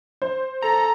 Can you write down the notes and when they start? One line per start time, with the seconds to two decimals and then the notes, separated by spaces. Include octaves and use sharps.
0.22 C5
0.62 A4 A#5